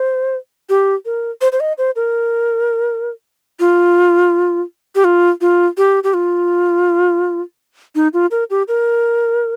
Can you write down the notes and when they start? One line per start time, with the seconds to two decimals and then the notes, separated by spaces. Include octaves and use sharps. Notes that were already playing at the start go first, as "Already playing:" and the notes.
Already playing: C5
0.69 G4
1.05 A#4
1.41 C5
1.52 C5
1.60 D#5
1.78 C5
1.96 A#4
3.60 F4
4.95 G4
5.04 F4
5.41 F4
5.77 G4
6.04 G4
6.14 F4
7.95 D#4
8.13 F4
8.31 A#4
8.50 G4
8.68 A#4